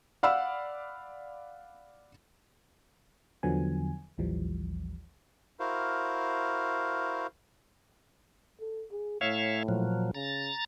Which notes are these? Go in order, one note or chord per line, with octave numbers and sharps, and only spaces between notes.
D5 F5 F#5 B5 E6
E2 D3 F3 F#3 B3 G#5
A1 D#2 E3 F3 G3
E4 F#4 A#4 C5 F5
A4
G#4
A2 C#5 E5 F5
A#2 F3 F#3
C#3 A#5 A6